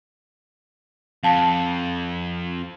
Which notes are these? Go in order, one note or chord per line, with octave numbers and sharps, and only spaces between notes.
F2 F5 A5